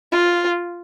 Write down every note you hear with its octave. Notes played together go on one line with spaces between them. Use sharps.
F4